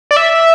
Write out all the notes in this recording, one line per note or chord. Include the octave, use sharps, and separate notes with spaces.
D5
E5